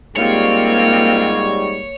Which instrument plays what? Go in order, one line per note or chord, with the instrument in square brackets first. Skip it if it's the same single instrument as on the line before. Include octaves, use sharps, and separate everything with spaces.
[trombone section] G#2 G3 [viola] A#3 [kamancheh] C4 F4 [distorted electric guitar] C#5